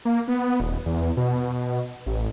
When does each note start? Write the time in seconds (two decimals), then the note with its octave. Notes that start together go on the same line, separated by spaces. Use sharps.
0.05 A#3
0.28 B3
0.60 D#1
0.86 E2
1.17 B2
2.06 A1